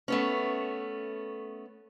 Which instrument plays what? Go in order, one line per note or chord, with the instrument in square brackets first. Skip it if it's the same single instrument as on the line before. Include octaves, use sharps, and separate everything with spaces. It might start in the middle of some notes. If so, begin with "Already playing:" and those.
[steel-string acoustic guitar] A3 B3 C#4